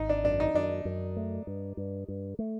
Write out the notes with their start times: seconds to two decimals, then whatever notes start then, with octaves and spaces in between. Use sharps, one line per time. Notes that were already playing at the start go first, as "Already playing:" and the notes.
Already playing: G#1 D#4
0.09 D4
0.24 F#2 D4
0.40 D#4
0.54 F#2 D4
0.85 F#2
1.17 A3
1.47 G2
1.77 G2
2.08 G2
2.39 A3